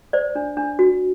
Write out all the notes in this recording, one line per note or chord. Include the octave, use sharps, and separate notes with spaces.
C5 D5
D4
D4
F#4